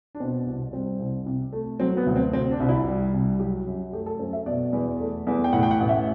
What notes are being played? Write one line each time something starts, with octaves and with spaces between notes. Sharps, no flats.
D4
B2 C4
C2
G3 C4
C2
C3
A3
F#3 C4
B3
D2
C4
C3 C4
D4
C2
E4
G3
C2
F#3 G4
F#2
A3 G4
A4
F#2 C5
E5
B2 D5
E2
A3
E2
G5
A2 F#5
G5
F#5
A1
E5